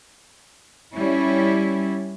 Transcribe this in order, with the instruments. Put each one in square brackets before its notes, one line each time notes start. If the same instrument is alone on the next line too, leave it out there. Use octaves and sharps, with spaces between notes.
[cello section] G3 C#4 E4